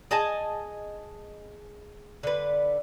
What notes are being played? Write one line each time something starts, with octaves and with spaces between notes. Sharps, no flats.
G#4 D#5 G#5 A5
D3 B4